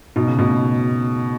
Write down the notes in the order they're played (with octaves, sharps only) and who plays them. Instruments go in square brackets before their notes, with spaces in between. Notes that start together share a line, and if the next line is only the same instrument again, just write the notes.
[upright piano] B2 [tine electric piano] D#4
[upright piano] C#3
[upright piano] B2 [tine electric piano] A3